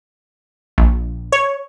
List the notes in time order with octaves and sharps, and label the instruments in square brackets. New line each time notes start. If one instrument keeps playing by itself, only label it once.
[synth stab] A#1
C#5